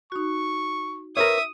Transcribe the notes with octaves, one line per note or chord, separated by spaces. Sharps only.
D#4 F#4 C#6
A#4 B4 C#5 E5 D#6